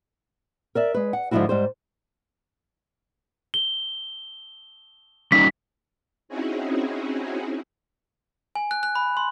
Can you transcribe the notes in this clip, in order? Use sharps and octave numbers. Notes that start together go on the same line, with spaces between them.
A#4 D5 E5
G#3 B4
F#5
G#2 D3 F3 A3 E4 F#4
G#2 G3 C5
G7
G3 C#4 D#4 B6
C4 C#4 D#4 E4 F#4 G#4
G#5
F#6
F#6
B5
C6